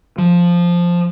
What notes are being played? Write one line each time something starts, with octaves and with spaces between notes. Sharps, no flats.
F3